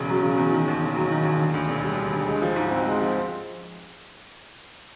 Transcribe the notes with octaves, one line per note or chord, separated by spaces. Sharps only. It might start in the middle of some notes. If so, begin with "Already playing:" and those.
Already playing: E1 E2 C#3
F#3
C#3
E2
D#3
D#2
E1
F#3
D#3
D#2
D3
D2
E1
G3
D3
D2
G#3
F3
G#2
C4
G#3
F3